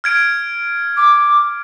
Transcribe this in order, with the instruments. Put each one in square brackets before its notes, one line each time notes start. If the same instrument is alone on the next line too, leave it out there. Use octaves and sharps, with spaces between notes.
[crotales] F6 G#6 D7
[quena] D6